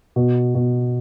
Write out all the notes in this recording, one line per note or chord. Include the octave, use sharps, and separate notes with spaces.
B2
B2